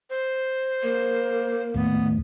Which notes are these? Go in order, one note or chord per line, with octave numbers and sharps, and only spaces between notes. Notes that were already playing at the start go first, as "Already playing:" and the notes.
C5
A#3 A#4
D#2 A2 B3